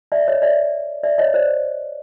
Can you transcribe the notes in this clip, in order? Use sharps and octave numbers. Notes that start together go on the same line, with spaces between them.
D5 E5
C#5 D#5
D5 E5
D5 E5
C#5 D#5
C5 D5